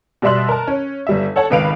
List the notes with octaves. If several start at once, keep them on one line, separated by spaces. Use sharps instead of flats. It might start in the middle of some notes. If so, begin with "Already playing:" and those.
B2 G3 D5 E5 C6 F#6
A#4 A5
C#4
G1 G3 E5
A4 C#5 F#5 A5
G#1 C#2 B4 F5 D7 F7